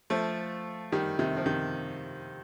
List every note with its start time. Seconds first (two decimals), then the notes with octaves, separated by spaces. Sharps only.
0.10 F3 A3
0.92 D#3 G3
1.19 C3 D#3
1.37 F3
1.46 C3 D#3